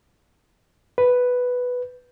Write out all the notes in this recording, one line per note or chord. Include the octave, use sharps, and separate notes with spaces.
B4